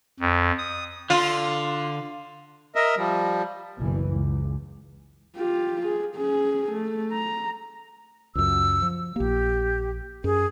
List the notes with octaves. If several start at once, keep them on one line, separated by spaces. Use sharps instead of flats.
F2
D#6
D3 F4
A#4 D#5 E5
F3 G3
F#1 B1 E3
C#2
F4 G4
G#4
C#4 G#4
A3
A#5
C#2 F#2 E6
F3
A#1 A#3 G4
F#2 G#4